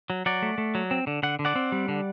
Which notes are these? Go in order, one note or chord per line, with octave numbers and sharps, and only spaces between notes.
F#3
F#3 D5 F#5
A3
A3
F#3
C4
D3
D3 F#5
D3
D5 F#5
C4
G3
D3